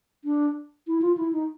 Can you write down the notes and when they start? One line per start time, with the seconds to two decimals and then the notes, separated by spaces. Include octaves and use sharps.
0.24 D4
0.87 E4
1.02 F4
1.17 E4
1.33 D#4